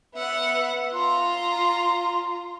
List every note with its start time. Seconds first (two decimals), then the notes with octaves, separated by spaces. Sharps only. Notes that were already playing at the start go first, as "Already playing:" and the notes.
0.14 B3 E5 F#5
0.93 F4 A#5 C6